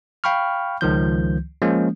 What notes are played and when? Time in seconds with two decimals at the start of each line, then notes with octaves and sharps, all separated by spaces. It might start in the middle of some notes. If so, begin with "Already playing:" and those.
0.24 F5 G5 B5 C#6 F6
0.81 C#2 D#3 F3 G6
1.62 F3 G#3 A#3 C#4